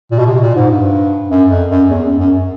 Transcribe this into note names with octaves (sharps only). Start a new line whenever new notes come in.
A#2
B2
C3
A#2
G#2
G2
F#2
F2
F#2
E2
F#2
F#2